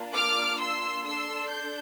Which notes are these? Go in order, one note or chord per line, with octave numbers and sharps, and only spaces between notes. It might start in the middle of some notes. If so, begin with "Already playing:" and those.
Already playing: A#3 D4 F4
D6 F6
C6 E6
D4 A4 C6 E6
G6